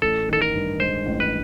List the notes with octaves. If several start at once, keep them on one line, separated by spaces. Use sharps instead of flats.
A1 A4
D#3 A4
A#4
G2
G#3 C5
A1
B4